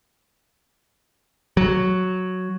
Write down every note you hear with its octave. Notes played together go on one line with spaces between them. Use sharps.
F#3